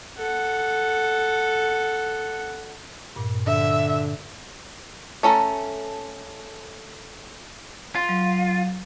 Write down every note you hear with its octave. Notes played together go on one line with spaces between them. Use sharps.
A4 F#5
G2 A#2
D3 E5
A3 C#4 A4 A#5
F4
F#3